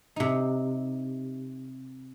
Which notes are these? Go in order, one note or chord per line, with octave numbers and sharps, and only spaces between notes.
C3 D#4